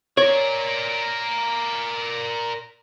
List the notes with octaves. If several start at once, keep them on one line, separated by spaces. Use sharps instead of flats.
A#4 C#5 D5